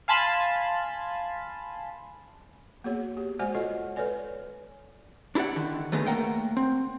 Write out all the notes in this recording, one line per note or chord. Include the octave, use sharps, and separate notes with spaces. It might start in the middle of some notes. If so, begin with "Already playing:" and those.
F5 G#5 A5 B5 C6
A#3 B3 F#4 G#4 C#5
G4
G#3 F#4 C5 D5 F#5 G#5
F4 A4 C#5 D#5 F#5
A4 B4 C#5 D5 G#5
D4 E4 G4 D5 F#5
D3 D#3
D3 D#3 G#3 A3 B3
A3 A#3 A#4 F#5 G5
C4